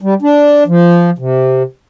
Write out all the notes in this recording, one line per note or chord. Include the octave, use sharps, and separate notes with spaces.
G3
D4
F3
C3